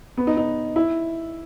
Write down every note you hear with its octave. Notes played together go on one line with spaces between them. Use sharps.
B3
D#4
D#4
E4